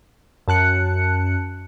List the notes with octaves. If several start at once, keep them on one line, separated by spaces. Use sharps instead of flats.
F#2 A5 F#6 C#7